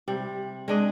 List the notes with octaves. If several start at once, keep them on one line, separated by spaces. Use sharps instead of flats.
C3 G3
G#3 D4 D#5